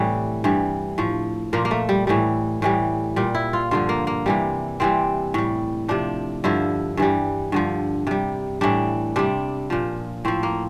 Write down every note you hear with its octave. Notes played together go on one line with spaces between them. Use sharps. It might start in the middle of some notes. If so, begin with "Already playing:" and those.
Already playing: A2 C3 E3 G3 A3
G2 E3 G3
A2 F3
A#2 F3 A#3
A#3
A3
G3
A2 E3 G3
A2 E3 G3
A#2 G3
E4
F4
G2 D3 F3 F4
A#3
A#3
C3 E3 G3
C3 E3 G3 C4
A2 G3
C3 F3 D4
G2 D3 F3 E4
G2 E3 G3
G2 D3 F3
C3 G3
A2 E3 G3 D4
C3 G3 D4
A#2 F3
A2 F3 C4
A#3